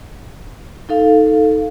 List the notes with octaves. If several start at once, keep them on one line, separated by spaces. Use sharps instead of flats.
D#4 A4 F5